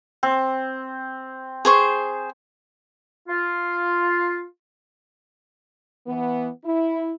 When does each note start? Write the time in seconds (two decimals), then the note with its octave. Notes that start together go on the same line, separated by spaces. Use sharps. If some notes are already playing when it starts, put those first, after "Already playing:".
0.23 C4
1.65 G#4 C5 C#6
3.28 F4
6.07 E3 B3
6.65 E4